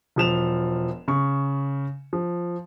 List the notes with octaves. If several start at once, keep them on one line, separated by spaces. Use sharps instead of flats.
E1 F3 E7 F7
C#3 C#6
F3